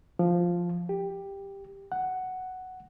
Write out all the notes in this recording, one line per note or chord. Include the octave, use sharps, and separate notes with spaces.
F3
G4
F#5